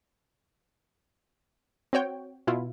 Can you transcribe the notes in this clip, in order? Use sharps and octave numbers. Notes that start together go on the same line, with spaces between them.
C4 F#4 C#5 G5
B2 E4 F4